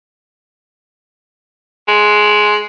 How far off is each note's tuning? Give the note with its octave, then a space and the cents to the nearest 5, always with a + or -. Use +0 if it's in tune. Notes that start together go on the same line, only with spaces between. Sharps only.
G#3 +10